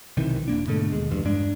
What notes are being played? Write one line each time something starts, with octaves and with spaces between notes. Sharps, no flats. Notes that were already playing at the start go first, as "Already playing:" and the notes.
B1 C3 D#3 E3
E1 A#3 D4
G#2 B2 D3 A3
D#2 G#3
A1 E2 G2
G2 G#3 D4